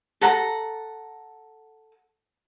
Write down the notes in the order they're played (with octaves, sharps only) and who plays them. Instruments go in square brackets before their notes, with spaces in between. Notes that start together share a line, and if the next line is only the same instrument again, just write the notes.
[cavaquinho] A4 F#5 A#5